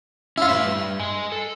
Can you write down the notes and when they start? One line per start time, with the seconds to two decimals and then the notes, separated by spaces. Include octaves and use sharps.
0.38 C#4 E4 F4 C#5
0.49 A2 B4 E5
0.66 G2
0.99 D#5 G#5
1.32 A4